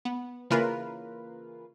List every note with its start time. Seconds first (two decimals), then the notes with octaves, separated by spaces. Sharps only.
0.05 B3
0.50 C#3 E3 A#3 F4 A#4 B4